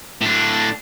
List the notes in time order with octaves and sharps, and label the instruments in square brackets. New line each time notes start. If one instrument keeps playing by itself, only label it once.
[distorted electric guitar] A2 D4